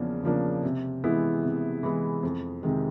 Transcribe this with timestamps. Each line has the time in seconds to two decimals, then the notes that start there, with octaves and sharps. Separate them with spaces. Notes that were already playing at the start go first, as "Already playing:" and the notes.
Already playing: E2 C#3 F3 A#3 D4
0.23 C#3 F3 A#3 D4
0.63 C3
1.04 E3 G#3 B3 E4
1.43 C3
1.83 E3 G#3 B3 E4
2.23 F2
2.63 C3 D#3 G#3